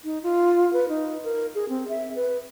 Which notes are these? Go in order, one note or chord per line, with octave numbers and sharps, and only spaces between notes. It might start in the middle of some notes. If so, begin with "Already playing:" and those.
D#4
F4
B4
D#4
A#4
G#4
C4
E5
B4